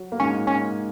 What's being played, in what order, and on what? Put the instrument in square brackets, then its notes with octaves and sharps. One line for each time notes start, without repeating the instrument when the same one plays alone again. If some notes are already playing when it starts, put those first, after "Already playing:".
Already playing: [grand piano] F#3
A#3
[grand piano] G#2 G#3 [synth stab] C#4
[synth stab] C#4